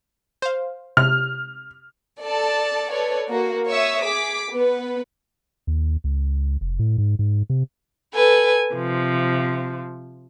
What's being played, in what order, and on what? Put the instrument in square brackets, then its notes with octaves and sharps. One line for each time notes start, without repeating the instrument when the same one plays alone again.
[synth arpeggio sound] C5 F5
[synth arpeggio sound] C3 [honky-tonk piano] F6
[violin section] A4 D5 A5
A4 B4 C#5 D5
A#3 F#4
C#5 E5 C#6 D#6 E6
G#4 D6 B6
B3 B4
[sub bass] D#2
C#2
F1
A2
G#2
G#2
C3
[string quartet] A4 B4 G#5
C3 F3